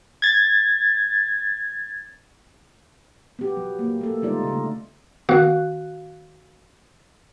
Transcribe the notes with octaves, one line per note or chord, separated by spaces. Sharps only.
G#6 A6
B3 G4
F#3
A#3
A3 A4
D3 G3 G#3 D#4 F4 D5
C#3 A3
D#3 B3 F#4 F5 F#6